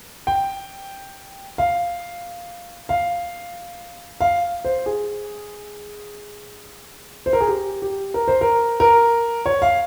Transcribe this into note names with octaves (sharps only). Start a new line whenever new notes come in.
G5
F5
F5
F5
C5
G#4
C5
A#4
G#4
G4
G4
A#4
C5
A#4
A#4
C#5
F5